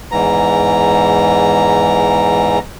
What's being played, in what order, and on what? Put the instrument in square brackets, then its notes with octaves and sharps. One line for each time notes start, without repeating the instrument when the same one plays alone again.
[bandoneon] E2 G#2 E3 A#5